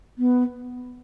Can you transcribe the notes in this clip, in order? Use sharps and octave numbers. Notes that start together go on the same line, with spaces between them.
B3